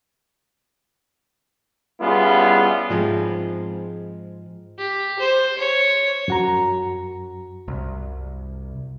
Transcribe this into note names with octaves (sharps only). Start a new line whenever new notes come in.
G3 B3 C#4 E4 F4 G#4
G#2 F3 G#3 C4
G4
C5
C#5
F#2 F#4 A#5
C2